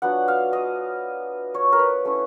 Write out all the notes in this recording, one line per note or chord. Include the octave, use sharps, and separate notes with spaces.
F#3 B3 D4 F4 F#5
F5
D#5
C#5
A#4
B4
A3 C#4 E4